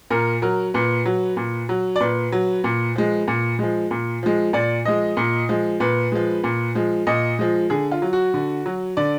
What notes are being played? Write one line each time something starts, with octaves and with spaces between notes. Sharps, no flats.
A#2 A#4
F#3 A#4
A#2 B4
F#3
A#2
F#3
D5
A#2 B4
F#3
A#2
F3 G#3
A#2
F3 G#3
A#2
F3 G#3
A#2 D5
F3 G#3 D#5
A#2
F3 G#3
A#2 B4
F3 G#3
A#2
F3 G#3
A#2 D#5
F3 G#3
D3 G#4
F4
F#3
F#4
D3
F#3
D3 D5